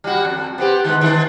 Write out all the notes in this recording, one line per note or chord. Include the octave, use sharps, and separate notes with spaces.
G3 F#4
F2
B3 C4 G4
D#3 G#3 B3
D#3